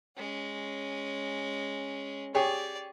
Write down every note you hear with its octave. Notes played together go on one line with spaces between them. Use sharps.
G#3 C#4
G4 G#4 C#5 D5